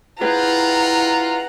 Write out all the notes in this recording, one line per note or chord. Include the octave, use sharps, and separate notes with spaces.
E4 F4 G#4 B4 F#5 G5 A#5